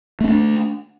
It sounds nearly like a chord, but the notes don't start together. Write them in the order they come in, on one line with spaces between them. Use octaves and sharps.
A3 C4 D4